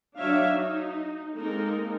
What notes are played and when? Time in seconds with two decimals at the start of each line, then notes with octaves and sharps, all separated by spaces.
0.18 F#3 D4 C#5 E5 F5
0.54 D#4
1.35 G#3 A#3 C4 D#4 A4 A#4